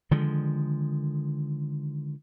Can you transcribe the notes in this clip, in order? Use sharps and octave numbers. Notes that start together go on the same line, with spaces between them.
D3 D#3 F3 G#3